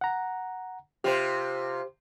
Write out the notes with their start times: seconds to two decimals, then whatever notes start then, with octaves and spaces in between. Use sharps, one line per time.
0.01 F#5 A#5
1.04 C3 F4 G4 C5